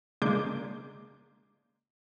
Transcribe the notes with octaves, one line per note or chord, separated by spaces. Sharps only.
C#3 G#3 A#3 D4 D6 G6